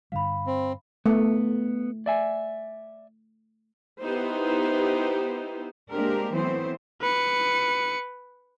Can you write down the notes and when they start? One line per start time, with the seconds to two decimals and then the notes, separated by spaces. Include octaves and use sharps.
0.12 G2 D3 G3 F5 B5
0.46 C4
1.06 A3 B3
2.06 D5 E5 G#5
4.00 B3 D#4 E4 G4 C5
5.91 G#3 A#3 C4 D4 G4 A#4
6.32 E3 F#3 A3 B3 C4 C5
7.01 B4 C#7